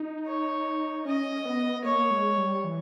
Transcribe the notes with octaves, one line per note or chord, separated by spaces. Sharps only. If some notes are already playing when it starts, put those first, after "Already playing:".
Already playing: D#4
C#5
C#4 D#5
B3
A#3 C#5
G#3
G3
E3